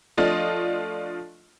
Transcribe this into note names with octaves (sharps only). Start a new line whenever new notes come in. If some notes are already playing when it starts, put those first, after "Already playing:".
F3 A3 D4 F4 D#5